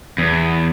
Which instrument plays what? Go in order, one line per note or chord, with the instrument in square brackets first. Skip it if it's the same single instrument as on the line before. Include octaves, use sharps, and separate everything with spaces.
[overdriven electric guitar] E2